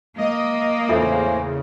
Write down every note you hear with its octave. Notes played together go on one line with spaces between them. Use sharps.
A#3 D#5 D#6
E2 A2 C#3 F4 A4 C5 E5 G#5